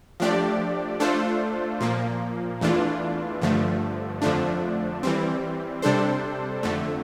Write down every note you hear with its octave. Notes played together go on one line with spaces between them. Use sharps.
F3 A3 D4 G4 D5
A3 D4 F4 A4 C5
A#2 F3 A#3
E2 E3 A3 D4 F4
G2 D3 F3 A3
F2 D3 F3 A3 D4
E3 G3 C4
C3 G3 D4 A4 C5
F2 D3 A3